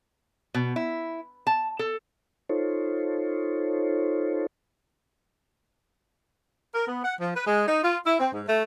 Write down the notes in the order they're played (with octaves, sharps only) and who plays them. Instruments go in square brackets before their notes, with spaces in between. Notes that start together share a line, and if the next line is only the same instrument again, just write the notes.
[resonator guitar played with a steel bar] B2
E4
A5
A4
[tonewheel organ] D#4 F4 A4 C5 C#5
[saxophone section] A#4
B3
F#5
F3
B4
G#3
D#4
F4
E4
C4
G#2
A3